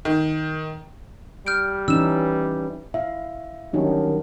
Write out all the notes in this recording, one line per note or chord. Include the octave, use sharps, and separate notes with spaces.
D#3
G3 F6 G6 D7
E3 C#4 D#4 E6 E7
E4 E5 F5
D#3 F#3 G3 C#4 D4 F#4 A#4